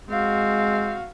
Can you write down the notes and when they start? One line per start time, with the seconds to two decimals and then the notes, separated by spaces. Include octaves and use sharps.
0.10 G#3 C4 F#4 F5